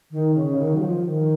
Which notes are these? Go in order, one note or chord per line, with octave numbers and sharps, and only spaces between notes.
D#3
C#3
D#3
F#3
F3
D#3